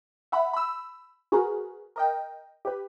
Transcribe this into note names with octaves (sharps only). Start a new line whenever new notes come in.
E5 F#5 B5
B5 E6
F#4 G#4 A#4 B4
A#4 D#5 G5
G4 B4